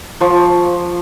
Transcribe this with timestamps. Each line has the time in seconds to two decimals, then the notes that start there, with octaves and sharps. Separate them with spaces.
0.21 F3 C#6